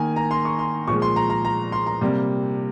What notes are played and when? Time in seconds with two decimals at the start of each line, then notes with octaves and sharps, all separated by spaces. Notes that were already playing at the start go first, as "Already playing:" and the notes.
Already playing: D#3 A#3 G#5
0.16 A#5
0.31 C6
0.45 C#6
0.59 C6
0.87 A#2 F3 G#3 C#6
1.02 C6
1.16 A#5
1.30 A#5
1.45 A#5
1.72 C6
1.87 A#5
2.01 C3 G3 A#3